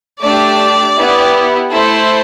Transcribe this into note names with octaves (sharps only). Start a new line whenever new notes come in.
A3 D4 G4 D5
B3 E4 G4
A3 E4 A4 C5